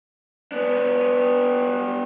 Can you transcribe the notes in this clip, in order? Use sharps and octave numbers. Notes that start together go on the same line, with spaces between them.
B3 D4